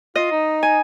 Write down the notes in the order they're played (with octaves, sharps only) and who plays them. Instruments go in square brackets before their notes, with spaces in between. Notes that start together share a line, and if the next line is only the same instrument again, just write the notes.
[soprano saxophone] F4 [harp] D#5
[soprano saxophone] D#4
[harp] G#5